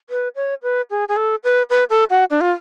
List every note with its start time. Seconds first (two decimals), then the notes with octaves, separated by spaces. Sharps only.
0.10 B4
0.36 C#5
0.63 B4
0.90 G#4
1.08 G#4
1.17 A4
1.44 B4
1.70 B4
1.90 A4
2.10 F#4
2.31 D4
2.41 F4